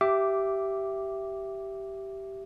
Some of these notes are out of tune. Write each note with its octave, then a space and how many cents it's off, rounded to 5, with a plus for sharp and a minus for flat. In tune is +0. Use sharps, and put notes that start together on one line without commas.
G4 -15 E5 +10 D6 +0